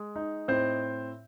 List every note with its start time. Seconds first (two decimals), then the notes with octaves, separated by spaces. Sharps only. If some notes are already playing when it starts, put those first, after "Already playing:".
Already playing: G#3
0.16 D#4
0.48 A2 C4 C5